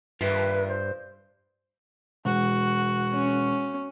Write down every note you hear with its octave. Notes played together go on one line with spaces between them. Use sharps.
G2 F4 A#4 B4 E5
C5
E1 F#4
C#4